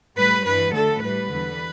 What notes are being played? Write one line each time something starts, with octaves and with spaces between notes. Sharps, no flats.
A2 G3 B4
G2 E3 G3 B4
D2 D3 A3 A4
A2 G3 B4
E2 D3 G3